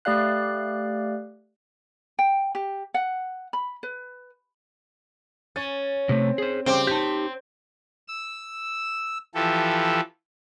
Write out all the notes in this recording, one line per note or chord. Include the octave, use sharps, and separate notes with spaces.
A3 G4 D5 F5 F#6
G5
G4
F#5
B5
B4
C#4 A6
C3 A3 C4
G#4 C5
C#3 G3 C4 G5 D6
D#4 G4 A5 G6
E6
E3 F3 G4 A4